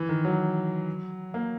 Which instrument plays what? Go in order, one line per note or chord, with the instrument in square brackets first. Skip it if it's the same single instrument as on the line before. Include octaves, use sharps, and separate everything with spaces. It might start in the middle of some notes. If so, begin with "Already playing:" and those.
Already playing: [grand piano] E3
D#3
F#3
A#3